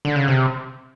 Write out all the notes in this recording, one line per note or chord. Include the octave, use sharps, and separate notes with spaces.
D3
C#3
C3